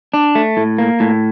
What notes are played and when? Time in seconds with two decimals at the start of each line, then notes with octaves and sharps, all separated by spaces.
0.14 D4
0.35 A3
0.57 A2
0.78 A#3
1.00 A2